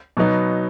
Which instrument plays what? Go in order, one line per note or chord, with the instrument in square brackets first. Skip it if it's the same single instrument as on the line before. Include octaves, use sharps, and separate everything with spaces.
[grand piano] B2 F#3 B3 D#4